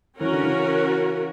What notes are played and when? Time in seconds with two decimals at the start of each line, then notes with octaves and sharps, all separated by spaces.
0.20 E3 C#4 F#4 A#4
0.32 D3
0.43 C#3 E3